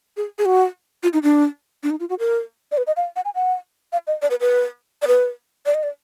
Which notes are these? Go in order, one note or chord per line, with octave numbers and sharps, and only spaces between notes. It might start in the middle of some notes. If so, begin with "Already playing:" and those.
G#4
G#4
F#4
F4
D#4
D4
D4
D#4
F4
F#4
A#4
D5
B4
D#5
F5
F#5
G#5
F#5
F5
D#5
D5
B4
B4
D5
B4
D5
D#5
D5